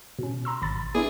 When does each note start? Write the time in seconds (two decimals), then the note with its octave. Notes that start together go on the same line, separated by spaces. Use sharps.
0.19 B2 C#4
0.45 A#5 C6 E6
0.62 G#1 B5 A6
0.95 B3 D4 E4 G#4